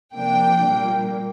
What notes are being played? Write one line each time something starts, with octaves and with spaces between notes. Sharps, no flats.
C3 F3 A#3 D4 G5
A#2 G3 A#3